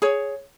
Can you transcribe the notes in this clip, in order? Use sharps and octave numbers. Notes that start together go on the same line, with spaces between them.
G#4 C#5